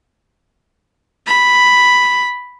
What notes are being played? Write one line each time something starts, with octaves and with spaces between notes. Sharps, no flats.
B5